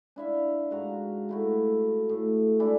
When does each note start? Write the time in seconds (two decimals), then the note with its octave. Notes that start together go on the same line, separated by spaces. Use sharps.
0.16 D4 E4 E5 F5
0.71 G#2 F#4 F5 A#5
1.29 A3 E4 F#4
2.09 A2
2.59 G#3 D4 E4 A4